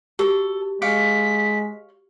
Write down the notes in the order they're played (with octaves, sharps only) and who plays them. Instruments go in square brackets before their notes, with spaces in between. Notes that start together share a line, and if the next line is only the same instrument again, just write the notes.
[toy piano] F#4 G4 A#4 [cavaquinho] A4
[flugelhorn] G#3 [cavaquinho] C#5 F5 D6 [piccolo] B6